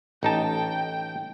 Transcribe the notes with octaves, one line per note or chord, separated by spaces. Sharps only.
A1 D#4 G5 A5